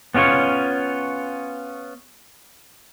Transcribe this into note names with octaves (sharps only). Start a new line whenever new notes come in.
B3 C#4 F4 G4 C#5